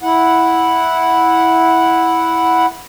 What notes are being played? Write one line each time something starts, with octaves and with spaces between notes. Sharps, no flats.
E4 F#5